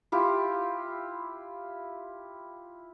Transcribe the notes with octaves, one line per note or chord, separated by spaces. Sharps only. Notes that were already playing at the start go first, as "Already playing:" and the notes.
E4 F4 G4